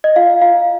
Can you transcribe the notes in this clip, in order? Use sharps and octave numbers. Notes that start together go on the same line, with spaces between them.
D#5
F4 F5
F4 F5